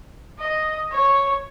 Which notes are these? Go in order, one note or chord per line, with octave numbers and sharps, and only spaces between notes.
D#5
C#5